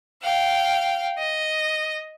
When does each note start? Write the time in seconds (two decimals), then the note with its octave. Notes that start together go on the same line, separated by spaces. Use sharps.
0.24 F5 G5
1.18 D#5